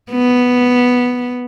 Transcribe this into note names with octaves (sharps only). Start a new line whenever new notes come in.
B3